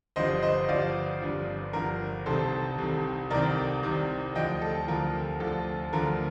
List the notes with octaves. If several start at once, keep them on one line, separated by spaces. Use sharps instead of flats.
G1 G2 F3 C5 D#5
C5 D#5
G1 G2 F3 D5 F5
G1 G2 F3
G1 G2 F3 A#4
C2 C3 D#3 A4 C5
C2 C3 D#3
C2 C3 D#3 A#4 D5
C2 C3 D#3
D2 D3 F3 D#5 G5
A4
D2 D3 F3 A#4
D2 D3 F3 A4
D2 D3 F3 A#4